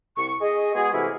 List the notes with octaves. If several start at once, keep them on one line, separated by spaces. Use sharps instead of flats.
C2 C#6
G#4 D#5
G#3 B3 F#4 G#4
C3 E3 A3 A#3 E4 G#4